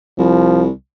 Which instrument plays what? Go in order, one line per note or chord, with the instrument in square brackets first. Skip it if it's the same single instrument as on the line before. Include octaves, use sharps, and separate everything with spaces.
[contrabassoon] C2 [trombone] F3